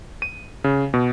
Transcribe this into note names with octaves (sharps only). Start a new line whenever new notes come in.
D#7
C#3
B2